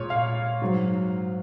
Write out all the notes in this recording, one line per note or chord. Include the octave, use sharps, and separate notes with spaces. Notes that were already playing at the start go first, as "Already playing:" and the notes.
Already playing: A#2 G#3 C#5
F5
G#2 F#3